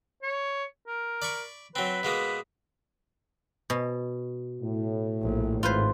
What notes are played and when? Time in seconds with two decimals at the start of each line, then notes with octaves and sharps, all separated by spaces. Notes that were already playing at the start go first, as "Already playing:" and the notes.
0.23 C#5
0.87 A#4
1.22 D5 B5 C#6
1.76 F#3 C4 B4
2.03 B2 G#3 A#3
3.70 B2
4.62 A2
5.22 A#1
5.63 G#1 F4 B4 C5